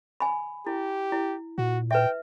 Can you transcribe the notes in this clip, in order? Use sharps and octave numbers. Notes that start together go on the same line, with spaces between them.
G#5 B5
E4 G4
E4
A#2 F#4
B4 E5 G5